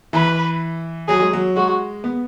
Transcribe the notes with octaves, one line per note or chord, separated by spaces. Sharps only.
E3 B4
F#3 G#4
G#3
F#3
G#3 F#4
B3